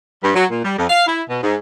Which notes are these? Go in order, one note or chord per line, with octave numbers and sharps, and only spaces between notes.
G2
F#3
A#2
G3
F2
F5
E4
B2
G#2